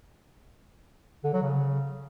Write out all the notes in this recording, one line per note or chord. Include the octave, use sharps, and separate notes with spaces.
D3
F#3
C#3